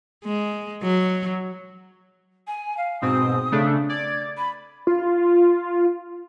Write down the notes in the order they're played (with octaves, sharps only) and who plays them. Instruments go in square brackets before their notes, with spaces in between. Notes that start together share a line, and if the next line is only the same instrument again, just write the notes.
[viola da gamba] G#3
F#3
[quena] G#5
F5
[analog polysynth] G#2 B2 C4 [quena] D#6
[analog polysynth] C#3 A3 D4
[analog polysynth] D5 [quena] G#6
[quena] B5
[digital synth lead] F4